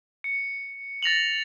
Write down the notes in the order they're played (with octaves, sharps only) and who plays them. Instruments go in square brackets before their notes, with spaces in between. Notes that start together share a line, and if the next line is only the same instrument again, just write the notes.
[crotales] C#7
A6 A#6 F7 F#7